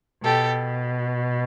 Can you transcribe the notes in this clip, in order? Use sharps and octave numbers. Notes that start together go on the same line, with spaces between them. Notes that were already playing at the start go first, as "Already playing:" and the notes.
B2 G4 A4